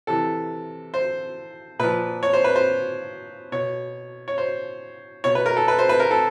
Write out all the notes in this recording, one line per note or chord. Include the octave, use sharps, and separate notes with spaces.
C3 E3 A4
C5
A#2 F3 B4
C#5
C5
B4
C5
B2 C#5
C#5
C5
B2 C#5
B4
A#4
A4
B4
C5
B4
A#4
A4